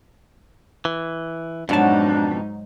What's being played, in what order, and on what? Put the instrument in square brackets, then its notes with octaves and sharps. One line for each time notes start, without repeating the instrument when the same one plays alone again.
[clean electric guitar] E3
[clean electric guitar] F2 B2 A5 [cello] G#2 D#4 [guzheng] F#3 F#4 [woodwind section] D4